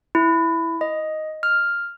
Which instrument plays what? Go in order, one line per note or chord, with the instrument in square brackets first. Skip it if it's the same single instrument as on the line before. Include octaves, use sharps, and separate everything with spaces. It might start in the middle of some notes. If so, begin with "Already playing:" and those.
[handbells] E4
D#5
F6